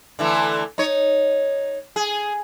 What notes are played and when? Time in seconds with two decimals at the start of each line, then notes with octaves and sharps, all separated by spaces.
0.19 D3 E3 A3
0.78 D#4 C#5
1.96 G#4